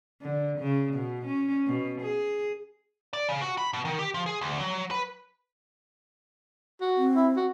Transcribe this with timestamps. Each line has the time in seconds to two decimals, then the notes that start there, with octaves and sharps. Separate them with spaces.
0.22 D3
0.59 C#3
0.95 B2
1.26 C#4
1.67 B2
2.01 G#4
3.13 D5
3.29 C#3
3.42 F#4
3.58 B5
3.73 B2
3.85 D#3
3.99 G4
4.14 F3
4.26 G#4
4.41 D2
4.60 F#3
4.91 B4
6.81 F#4
6.97 C4
7.16 E4
7.36 F#4